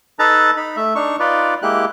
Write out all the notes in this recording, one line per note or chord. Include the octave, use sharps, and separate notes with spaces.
D#4 A4 B4 A5 A#5
D#4 B5
A3 E5
D4 D#4 C#6
D#4 F4 B4 D5
G#3 A#3 E4 G4 F#6